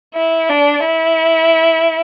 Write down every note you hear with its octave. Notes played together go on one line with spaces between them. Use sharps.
E4
D4
E4